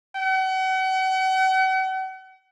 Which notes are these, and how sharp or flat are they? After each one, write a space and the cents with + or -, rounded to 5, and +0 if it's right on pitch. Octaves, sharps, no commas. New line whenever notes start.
F#5 +40